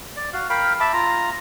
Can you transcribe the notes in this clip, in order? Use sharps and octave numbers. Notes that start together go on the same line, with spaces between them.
D5
F#4 F5
A#4 F5 G5 B5
E5 A5 B5 D6
F4 A#5